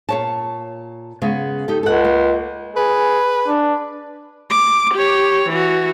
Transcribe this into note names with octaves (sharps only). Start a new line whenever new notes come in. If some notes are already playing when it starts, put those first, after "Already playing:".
A#2 C#5 A5
C#3 G#3 B3
D#4 G4 A4
C#2 A4 F#5
A#3
G#4 B4
D4
D6
G4 C#5
E3 F#4